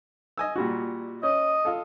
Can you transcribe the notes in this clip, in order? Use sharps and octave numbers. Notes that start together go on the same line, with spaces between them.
D#5 G#5 E6
A#2 G3 F#4
C#4 D#5
F4 A4